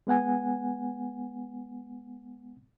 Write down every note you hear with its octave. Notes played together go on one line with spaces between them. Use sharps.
G#3 B3 F#5 G#5